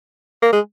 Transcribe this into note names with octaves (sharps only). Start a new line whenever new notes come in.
A#3
G#3